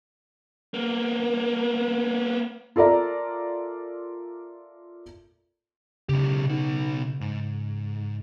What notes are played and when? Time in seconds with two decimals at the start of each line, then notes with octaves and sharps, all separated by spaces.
0.74 A#3 B3
2.76 F4 A4 A#4 D5 E5 A#5
6.09 B1 C#3 G4
6.46 B2 D#4
7.21 G#2